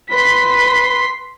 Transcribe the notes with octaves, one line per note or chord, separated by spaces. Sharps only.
B4 C6 B6